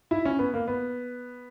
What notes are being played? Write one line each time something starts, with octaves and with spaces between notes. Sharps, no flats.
E4
C#4
B3
A#3
B3